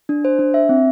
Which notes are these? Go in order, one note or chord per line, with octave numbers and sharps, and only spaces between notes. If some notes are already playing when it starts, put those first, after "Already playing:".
D4
C5
D4
E5
C4